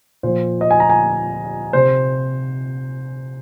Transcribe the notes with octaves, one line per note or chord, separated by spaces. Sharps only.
A#2 F3 C5
D#5
G#5
A#5
G#5
C3 C5